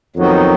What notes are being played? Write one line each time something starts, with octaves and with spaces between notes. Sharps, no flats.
F2 D#3 F#3 B3 D#4 F#4